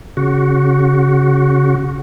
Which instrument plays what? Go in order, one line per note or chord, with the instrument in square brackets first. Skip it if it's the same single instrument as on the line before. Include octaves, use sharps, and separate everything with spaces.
[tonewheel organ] C#3 F#4